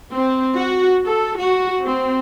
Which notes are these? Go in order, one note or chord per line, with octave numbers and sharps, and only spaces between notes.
C4
F#4
A4
F#4
C4